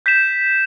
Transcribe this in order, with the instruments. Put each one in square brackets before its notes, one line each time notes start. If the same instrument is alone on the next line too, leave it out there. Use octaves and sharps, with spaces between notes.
[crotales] G6 B6 E7